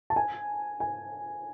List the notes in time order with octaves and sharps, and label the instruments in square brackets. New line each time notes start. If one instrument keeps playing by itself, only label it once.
[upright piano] A5
G#5
G#5